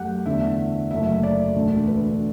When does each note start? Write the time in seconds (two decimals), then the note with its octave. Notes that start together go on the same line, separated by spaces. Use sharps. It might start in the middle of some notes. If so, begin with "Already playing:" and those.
Already playing: F#2 F#3 A3 G4 F#5
0.26 E2 D3 A3 E5
0.91 F#1 F#2 F#3 A3 E5
1.23 D5
1.55 E1 D2 D3 A3
1.88 B4